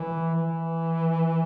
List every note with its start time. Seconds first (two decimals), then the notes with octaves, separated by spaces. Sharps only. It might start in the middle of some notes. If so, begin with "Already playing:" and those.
Already playing: E3
0.35 E3